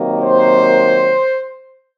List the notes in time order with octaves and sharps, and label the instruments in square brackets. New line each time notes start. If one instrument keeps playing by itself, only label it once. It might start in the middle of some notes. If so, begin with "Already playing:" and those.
Already playing: [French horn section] C3 D#3 F#3 A#3
[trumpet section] C5